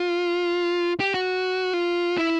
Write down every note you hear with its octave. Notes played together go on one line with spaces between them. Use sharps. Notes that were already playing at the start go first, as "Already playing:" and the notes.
Already playing: F4
G4
F#4
F4
E4